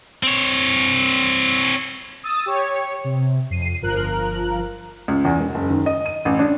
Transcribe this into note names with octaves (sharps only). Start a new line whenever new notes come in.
C4 C#5
D#6 E6 A6
G4 C#5
C3
F2 C7 D#7
G1 F3 A#4 F#6
C#2
E2
E1
F#1
D#3
D#5
D#7
A1
D4